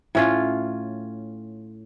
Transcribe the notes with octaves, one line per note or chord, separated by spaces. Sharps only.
A2 C#4 F4